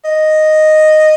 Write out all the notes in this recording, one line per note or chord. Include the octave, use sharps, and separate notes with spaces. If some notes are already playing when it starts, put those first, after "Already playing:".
D#5